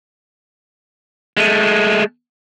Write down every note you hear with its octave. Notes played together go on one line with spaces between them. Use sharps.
G#3 A3